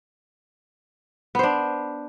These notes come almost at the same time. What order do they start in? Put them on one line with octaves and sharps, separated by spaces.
B3 C5 D4